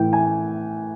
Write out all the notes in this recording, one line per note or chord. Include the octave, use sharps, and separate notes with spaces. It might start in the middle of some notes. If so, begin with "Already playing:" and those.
Already playing: A2 E3 G5
G#5